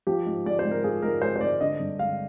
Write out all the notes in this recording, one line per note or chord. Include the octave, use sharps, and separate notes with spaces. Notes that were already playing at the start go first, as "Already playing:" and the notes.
F3 G4
G#2
G#3 D5
C5
G#2
A#4
F3 G#4
G#2 A#4
G#3 C5
C5
G#2 D5
D3 D#5
G2
G#3 F5